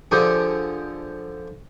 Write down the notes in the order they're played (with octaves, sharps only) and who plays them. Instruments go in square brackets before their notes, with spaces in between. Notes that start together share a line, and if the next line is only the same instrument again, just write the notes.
[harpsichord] D3 F3 G4 G#4